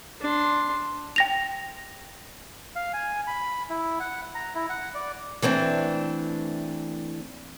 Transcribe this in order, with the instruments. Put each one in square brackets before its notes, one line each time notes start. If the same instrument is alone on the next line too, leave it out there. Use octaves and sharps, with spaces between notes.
[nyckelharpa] D4 C6
[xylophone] G5 A#6 F7
[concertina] F5
G#5
B5
E4
F#5
A#5
E4
F#5
D5
[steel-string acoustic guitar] E3 A3 C4 D4